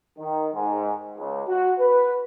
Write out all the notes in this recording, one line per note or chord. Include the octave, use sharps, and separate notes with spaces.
D#3
G#2
C#2
F#4
B4